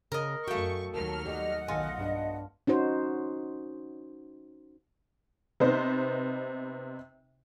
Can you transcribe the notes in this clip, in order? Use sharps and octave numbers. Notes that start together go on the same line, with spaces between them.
C#3 A#4 D#5
F#2 A3 F#4 F5 G5 C#6
D#2 F#3 A#4 A5 F6
G3 G4 D#5 F#5
B1 D#3 F4 A4 G#5
G2 G3 D4
C#4 D#4 F#4 C5
C3 B3 D#4 C5